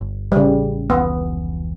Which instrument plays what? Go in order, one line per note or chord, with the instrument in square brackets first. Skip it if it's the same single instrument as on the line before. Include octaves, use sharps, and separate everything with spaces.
[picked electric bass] G1
[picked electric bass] A1 [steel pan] C#3 G3
[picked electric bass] F1 C#2 E3 [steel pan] B3